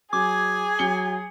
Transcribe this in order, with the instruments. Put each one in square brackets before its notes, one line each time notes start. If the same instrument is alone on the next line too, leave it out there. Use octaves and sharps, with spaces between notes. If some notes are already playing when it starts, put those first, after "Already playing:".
[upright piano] F#3 [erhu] G#4 [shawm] G#5 [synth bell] D6
[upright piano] F#3 C#7 G7